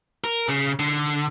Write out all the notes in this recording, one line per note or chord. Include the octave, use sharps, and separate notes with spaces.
A#4
C#3
D3